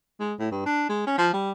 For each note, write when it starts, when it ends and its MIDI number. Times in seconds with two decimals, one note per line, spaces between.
0.20 0.34 56
0.39 0.49 45
0.51 0.63 43
0.66 0.86 62
0.89 1.05 56
1.07 1.15 61
1.18 1.30 53
1.34 1.52 55